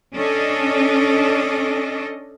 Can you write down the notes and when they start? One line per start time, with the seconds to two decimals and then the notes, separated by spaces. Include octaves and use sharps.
0.14 C#4 D4 A4 D5 D#5